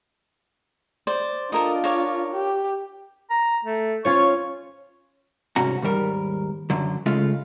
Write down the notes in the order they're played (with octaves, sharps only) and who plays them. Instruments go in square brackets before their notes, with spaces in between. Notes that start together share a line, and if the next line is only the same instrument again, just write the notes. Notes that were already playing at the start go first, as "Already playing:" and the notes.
[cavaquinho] C5 D5
[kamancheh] D4 F4 [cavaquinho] A4 A#4 D#5
[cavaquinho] A#4 C#5 D6
[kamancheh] G4
[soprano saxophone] A#5
A3
[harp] C#4 F4 C#5 [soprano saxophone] C#6
[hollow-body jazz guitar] C2 G#2 C#4 F#4 A#5
D#2 G#2 G3 A#4
F#2 D3 F#3
C#3 G#3 A3 F4